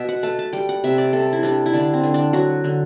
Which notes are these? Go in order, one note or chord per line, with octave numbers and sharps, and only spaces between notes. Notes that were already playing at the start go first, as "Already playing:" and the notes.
Already playing: B2 E5
F#5
A3 A5
A5
G3 G5
F#5
C3 E5
D5
C3 A4
E4
G3 D4
E4
D3 D4
C4
D3
D4
F#3 F#4
D3